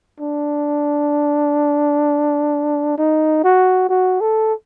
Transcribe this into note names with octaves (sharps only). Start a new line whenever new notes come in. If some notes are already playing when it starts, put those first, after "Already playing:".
D4
D#4
F#4
F#4
A4